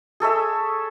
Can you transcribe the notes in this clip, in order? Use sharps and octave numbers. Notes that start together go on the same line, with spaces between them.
G#4 A4 C#5 E5